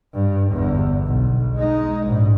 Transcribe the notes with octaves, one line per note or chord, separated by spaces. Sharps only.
G2
G1 E2
B1
G#3 D#4
A#1 G#2